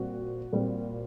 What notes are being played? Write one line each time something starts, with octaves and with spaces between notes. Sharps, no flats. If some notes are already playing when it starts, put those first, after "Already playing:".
Already playing: A#2 G3 C4 F#4
A#2 G3 C4